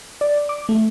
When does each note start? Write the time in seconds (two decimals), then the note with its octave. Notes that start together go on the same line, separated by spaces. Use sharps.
0.21 D5
0.49 D6
0.69 A3